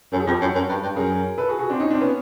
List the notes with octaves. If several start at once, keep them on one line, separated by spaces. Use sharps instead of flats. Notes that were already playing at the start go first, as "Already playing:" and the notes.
F#2 A4
G#4
F2 G4 A4
F#2
F#2
G2
G2
F#2 G#4 A#4
A4 B4
F#4 G#4
F#4 G#4
C4 D4
C#4 D#4
C4 D4
B3 C#4